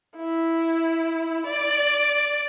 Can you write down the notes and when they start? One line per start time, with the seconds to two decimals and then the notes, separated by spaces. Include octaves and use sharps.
0.16 E4
1.46 D5